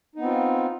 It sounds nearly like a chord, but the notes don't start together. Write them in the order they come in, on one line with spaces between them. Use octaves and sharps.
D#4 B3 C4 F4